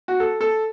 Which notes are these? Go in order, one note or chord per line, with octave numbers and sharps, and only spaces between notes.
F#4
A4
A4